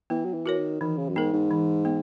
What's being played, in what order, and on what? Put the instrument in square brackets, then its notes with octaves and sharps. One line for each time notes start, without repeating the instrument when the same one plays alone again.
[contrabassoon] E3 [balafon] B3
[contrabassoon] F#3
E3
[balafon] F#4 A#4 C#5
[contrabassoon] D#3
[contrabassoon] D#3 [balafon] E3
[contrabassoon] C#3
F#2
[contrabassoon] G#2 [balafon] B3 D#4 A#4
[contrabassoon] G#2
[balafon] E3
B3